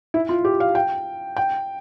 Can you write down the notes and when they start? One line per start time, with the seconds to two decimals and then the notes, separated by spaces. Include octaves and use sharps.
0.14 E4
0.29 F4
0.45 G4
0.60 F5
0.75 G5
1.37 G5